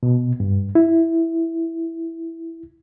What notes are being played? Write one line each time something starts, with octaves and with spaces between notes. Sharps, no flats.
B2
G2
E4